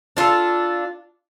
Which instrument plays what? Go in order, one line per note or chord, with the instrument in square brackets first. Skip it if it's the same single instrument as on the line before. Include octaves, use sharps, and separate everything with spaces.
[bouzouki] D4 F4 G4 A4